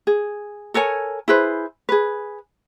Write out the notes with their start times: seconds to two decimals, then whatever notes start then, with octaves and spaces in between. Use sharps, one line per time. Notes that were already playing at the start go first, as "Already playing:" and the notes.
0.07 G#4
0.74 A4 A#4 C#5 G#5
1.28 E4 G#4 B4 C5
1.89 G#4 B4